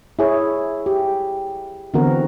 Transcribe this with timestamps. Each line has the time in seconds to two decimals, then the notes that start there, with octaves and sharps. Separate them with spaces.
0.19 E4 G#4 C#5
0.86 G4
1.94 D3 E3 B3 C4 F#4 A#4